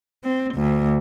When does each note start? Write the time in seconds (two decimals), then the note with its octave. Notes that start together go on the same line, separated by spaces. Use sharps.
0.24 C4
0.55 D2